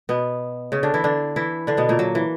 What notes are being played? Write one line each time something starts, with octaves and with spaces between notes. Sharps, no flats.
B2 B3
C#3 C#4
D3 D4
E3 E4
D3 D4
E3 E4
D3 D4
B2 B3
A#2 A#3
F#3
E3